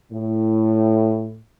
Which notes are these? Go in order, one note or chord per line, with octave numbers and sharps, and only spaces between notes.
A2